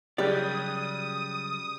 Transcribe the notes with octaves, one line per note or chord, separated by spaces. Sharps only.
C#3 F#3 G3 G4 G#4 D5 D#6 F6